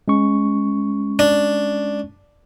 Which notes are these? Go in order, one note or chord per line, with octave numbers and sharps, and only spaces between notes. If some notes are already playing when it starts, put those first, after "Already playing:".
G#3 C#4 C#6
D4